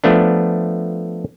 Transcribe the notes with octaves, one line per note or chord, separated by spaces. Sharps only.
F3 A3 B3 D4